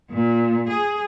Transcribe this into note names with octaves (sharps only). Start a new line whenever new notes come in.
A#2
G#4